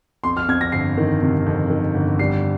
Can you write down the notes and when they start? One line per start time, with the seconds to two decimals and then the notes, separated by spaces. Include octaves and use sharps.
0.24 F2 C6
0.37 F6
0.48 F2 G#6
0.61 A#6
0.72 G1 C7
0.97 D#3
1.22 C3
1.46 F2
1.70 D#3
1.94 G1
2.19 G3 C7